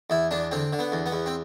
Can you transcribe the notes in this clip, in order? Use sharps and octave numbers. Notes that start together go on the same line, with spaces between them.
E2 E4
E2 D4
D3 C4
D3
B3
E2
B3
E2
C4